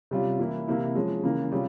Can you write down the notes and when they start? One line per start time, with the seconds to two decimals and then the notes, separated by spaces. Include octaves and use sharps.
0.11 C3 G3 C#4 F4
0.39 E3 A#3 E4
0.68 C3 E3 A#3 E4
0.95 F3 G#3 C#4
1.23 C#3 E3 A#3
1.51 C3 G3 C#4 F4 G#4